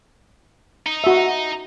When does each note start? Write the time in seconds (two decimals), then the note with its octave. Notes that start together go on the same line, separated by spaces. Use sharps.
0.86 D#4
1.04 F#4 E5